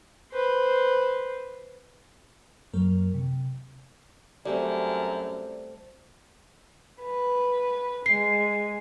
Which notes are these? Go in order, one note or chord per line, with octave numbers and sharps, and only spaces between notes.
B4 C5
F#2 F#3 A#3 A#4
C3
F#2 G3 A3 C4 D5
B4
G#3 C7